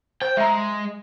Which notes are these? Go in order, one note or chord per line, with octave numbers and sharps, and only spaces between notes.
C5 G5
G#3 E5 A#5